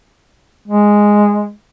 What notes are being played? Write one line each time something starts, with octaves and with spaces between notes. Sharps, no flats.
G#3